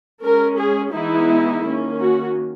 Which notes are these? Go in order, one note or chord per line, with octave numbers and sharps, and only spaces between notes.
G#3 C#4 A#4
G#4
E3 G#3 B3 D#4 E4
D#3 A#3 C#4
F#4